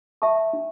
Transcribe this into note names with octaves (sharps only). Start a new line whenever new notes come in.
E5 A5 C#6
D4